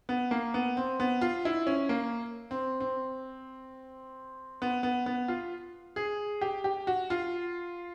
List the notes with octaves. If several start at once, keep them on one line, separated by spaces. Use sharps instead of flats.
B3
A#3
B3
C4
B3
F4
E4
C#4
A#3
C4
C4
B3
B3
B3
F4
G#4
G4
G4
F#4
F4